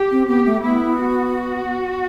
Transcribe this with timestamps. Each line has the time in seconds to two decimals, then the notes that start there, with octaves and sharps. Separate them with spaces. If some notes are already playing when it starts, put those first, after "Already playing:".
Already playing: G4
0.11 C4
0.28 B3 G4
0.45 A3
0.63 B3 E4
0.98 F#4